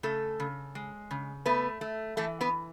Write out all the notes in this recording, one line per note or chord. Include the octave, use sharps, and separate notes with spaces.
C#3 A3 A4
C#3
G#3
C#3
A3 B3 B4
A3
E3 A3 A4
B3 B4